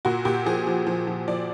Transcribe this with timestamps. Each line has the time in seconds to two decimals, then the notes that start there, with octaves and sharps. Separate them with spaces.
0.05 A#2 F#4
0.25 A#2 G4
0.45 F3 G#4
0.67 F3
0.87 F3
1.07 F3
1.28 F3 D5